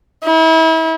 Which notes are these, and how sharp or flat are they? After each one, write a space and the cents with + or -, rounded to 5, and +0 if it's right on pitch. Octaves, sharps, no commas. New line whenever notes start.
E4 -35